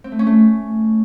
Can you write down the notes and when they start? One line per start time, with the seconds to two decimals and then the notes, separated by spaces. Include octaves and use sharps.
0.04 C4
0.12 A3
0.19 C#4
0.27 A3